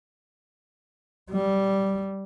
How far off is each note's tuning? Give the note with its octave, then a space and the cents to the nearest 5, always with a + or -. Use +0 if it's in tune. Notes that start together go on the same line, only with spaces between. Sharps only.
G3 -10